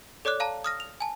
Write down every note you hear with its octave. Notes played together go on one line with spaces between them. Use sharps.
A4 C#5 D5 D6 F#6
F5 A5 A#5
D#6 F6 A#6
F7
G#5 A5